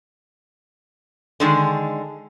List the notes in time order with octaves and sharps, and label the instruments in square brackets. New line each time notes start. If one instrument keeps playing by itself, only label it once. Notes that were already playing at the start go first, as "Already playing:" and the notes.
[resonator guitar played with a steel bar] D3 D#3 G#3